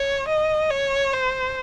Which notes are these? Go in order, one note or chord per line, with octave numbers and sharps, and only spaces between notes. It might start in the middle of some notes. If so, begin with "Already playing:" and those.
Already playing: C#5
D#5
C#5
C5